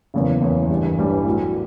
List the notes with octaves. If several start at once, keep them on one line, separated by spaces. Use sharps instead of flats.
F#1 E2 C#3
F#1 E2 C#3
A1 G2 E3 G3
A1 G2 E3 G3
A2 F#3 A3